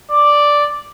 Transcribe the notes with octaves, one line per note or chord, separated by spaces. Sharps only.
D5